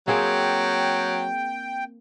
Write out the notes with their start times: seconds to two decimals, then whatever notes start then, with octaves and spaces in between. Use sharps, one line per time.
0.08 F#3 A#3 C4 G#4 G5